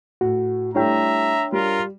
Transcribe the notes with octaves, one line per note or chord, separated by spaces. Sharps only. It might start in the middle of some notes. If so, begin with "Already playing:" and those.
A2 F#4
G3 A3 D4 E4 C#5 E5 G5 A#5
G3 F4 A#4